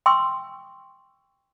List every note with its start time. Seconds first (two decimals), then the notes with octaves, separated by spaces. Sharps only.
0.06 G5 C6 C#6 E6